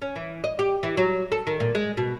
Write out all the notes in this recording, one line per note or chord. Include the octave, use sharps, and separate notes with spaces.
C#4
E3
D#5
G4
E3
F#3
A4
D#3
A#2
G#3
B2